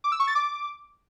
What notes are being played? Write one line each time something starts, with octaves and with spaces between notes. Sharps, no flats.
D6
E6
C#6
A6
D6